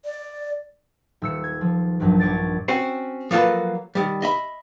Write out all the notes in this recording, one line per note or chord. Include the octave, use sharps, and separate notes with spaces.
D5
D#1 E6 C#7
G#6
F3
A#1 G2 F3 F#3
A#1 C#5 D5 A6
C4 C#4 F#4
F3 F#3 A#3 F4 A4 B4
D#3 G3
D#5 E5 B5